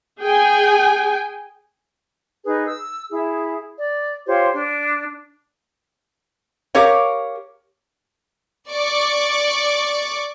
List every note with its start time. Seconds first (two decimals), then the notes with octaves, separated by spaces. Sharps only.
0.20 G#4 G5 G#5
2.44 D#4 G#4 B4
2.66 E6
3.10 E4 G#4
3.77 D5
4.26 F4 G4 C5 C#5
4.53 D4
6.75 G4 A#4 C#5 F5
8.69 D5 C#6 D6